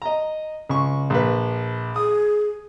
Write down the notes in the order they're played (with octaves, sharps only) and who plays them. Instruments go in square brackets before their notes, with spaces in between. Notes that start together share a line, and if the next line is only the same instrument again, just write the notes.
[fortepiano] D#5 A#5
C#2 C#6
A#1 B4
[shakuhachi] G#4 [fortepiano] D#6